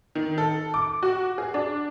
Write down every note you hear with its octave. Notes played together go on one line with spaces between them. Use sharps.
D#3
A4
D6
F#4
G#4
D4